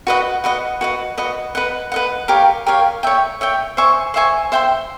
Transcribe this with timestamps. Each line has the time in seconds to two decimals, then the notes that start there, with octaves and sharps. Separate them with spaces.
0.07 F#4 B4 D#5 F#5
0.44 F#4 B4 D#5 F#5
0.81 F#4 B4 D#5
1.18 F#4 B4 D#5
1.55 B4 D#5 F#5
1.92 B4 D#5 F#5
2.28 G4 A#4 C#5 F5
2.66 G4 A#4 C#5 F5
3.03 C#5 E5 G5
3.41 C#5 E5 G5
3.77 C5 E5 G#5 C#6
4.14 C5 E5 G#5 C#6
4.52 C5 E5 G5 C6